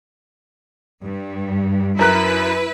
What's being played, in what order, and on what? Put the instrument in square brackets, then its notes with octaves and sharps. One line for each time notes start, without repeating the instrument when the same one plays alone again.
[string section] G2
[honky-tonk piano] F#2 A#4 F#6 [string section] E4 B4